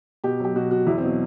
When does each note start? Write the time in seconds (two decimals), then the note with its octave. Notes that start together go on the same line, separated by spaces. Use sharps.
0.24 B2 G4
0.40 F#3 G4
0.55 B2 F#4
0.71 F#3 F#4
0.86 E2 E4
0.98 C4
1.03 B2 F#3